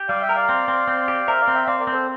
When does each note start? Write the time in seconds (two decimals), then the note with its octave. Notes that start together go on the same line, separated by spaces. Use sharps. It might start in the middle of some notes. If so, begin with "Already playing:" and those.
Already playing: G4
0.09 G3 D5 F5
0.22 E5 G5
0.29 A#4
0.35 D5 F5
0.49 C4
0.68 C4
0.88 C4
1.08 G4
1.27 A#4 C5 E5
1.41 D5 F5
1.48 C4
1.54 E5 G5
1.67 C4 D5 F5
1.80 A#4 D5
1.87 C4
1.93 A4 C5